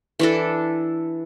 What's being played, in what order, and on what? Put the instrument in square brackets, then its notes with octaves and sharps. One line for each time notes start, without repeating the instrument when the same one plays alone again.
[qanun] E3 D4 A4